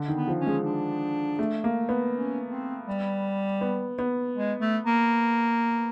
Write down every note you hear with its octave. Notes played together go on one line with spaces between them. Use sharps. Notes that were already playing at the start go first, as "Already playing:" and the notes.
Already playing: D3
D#3
B3
F3
C#4
G#3
D4
A3
A#3
B3
C#4
C4
G3
B3
B3
G#3
A3
A#3